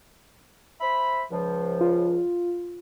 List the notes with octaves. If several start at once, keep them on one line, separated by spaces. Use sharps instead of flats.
C5 E5 B5
C#2 F3
F4